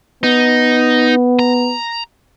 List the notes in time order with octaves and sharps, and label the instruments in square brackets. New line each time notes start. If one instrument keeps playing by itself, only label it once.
[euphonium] B3 [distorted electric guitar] D#4
[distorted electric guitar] A#5